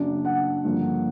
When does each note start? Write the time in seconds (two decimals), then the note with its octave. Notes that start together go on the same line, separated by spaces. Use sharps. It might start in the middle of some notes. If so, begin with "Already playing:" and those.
Already playing: F#2 C#3 F#3 A#3 D4
0.25 F#5
0.64 G2 D3 F3 A#3